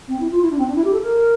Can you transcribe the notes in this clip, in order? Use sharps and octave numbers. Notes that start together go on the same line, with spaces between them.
C4
E4
F4
E4
D4
C4
D4
E4
G4
A4
A#4